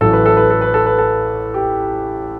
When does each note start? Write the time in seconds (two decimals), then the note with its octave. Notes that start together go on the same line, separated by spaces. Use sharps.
0.01 A1 A2 F#3 A4
0.13 B4
0.26 A4
0.37 B4
0.50 A4
0.61 B4
0.74 A4
0.86 B4
0.98 A4
1.54 G4